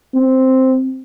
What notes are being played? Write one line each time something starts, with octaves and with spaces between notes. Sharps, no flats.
C4